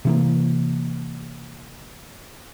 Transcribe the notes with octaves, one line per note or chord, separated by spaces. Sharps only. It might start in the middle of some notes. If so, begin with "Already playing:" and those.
C3 E3 A#3